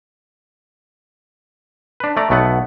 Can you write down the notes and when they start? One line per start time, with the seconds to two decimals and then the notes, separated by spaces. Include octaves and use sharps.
2.00 D4 B4
2.17 A3 D5 A#5
2.30 B1 A3 B3 F#5